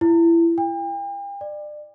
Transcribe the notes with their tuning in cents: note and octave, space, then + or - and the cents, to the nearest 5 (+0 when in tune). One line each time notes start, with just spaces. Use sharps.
E4 +25
G5 +40
D5 +30